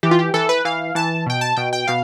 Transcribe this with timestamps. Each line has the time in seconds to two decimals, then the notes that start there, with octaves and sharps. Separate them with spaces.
0.03 E3 G4
0.11 F4
0.19 G4
0.34 E3 A4
0.49 B4
0.65 E3 F5
0.95 E3 A5
1.26 B2 G5
1.41 A5
1.56 B2 G5
1.73 G5
1.88 B2 F5